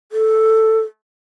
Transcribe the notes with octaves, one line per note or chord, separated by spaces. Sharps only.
A4